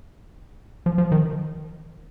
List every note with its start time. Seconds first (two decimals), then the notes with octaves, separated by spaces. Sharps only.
0.86 F3
0.98 F3
1.12 D#3